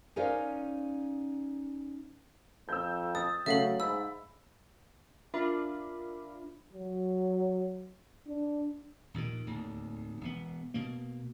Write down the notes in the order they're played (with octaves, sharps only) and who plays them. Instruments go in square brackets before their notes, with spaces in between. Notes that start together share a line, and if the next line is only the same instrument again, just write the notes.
[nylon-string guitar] C#4 D#4 A#4 C5 D5 F5
[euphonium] F2 [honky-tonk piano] E6 G6
[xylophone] D#6 [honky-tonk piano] A6
[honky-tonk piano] C#3 A3 [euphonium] F#3 [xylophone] E5 F5 F#7
[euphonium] G#2 [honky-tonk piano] B5 [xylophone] E6
[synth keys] D4 F4 A#4 [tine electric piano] E5 B5
[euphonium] F#3
D4
[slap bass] A#1 D#2 A#2 D#3
D1 D#2
E1 B3
B2 A#3